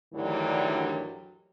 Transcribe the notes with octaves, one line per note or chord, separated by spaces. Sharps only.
D2 G2 D#3 E3 F#3 G3